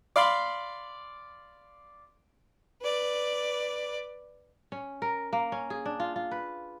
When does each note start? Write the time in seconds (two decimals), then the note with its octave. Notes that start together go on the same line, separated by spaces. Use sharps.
0.16 D5 F5 B5 C6 D6
2.82 B4 D5
4.72 C#4
5.02 A#4
5.33 A#3
5.52 C#4
5.70 G#4
5.86 D4
6.00 F4
6.16 F4
6.31 B4